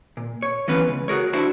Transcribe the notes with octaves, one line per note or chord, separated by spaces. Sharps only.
A#2
C#5
E3 B3 C#4 B4
C#2
F#4 G#4 A#4 C#5
D4 E4 F#4 C5 A5